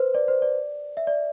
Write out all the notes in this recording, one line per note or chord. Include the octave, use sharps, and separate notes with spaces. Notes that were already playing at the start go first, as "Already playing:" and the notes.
Already playing: B4 C5
D5
C5
D5
E5
D5